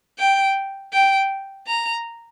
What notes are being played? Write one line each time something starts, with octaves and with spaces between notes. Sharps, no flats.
G5
G5
A#5